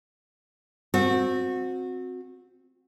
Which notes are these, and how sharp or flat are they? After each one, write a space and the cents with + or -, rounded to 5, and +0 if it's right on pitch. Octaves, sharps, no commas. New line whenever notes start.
C4 +0 F#4 -25